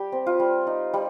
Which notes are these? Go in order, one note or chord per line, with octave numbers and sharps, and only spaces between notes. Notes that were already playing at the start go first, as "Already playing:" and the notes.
Already playing: G3 G4
C4
F4
G3
D#4
G3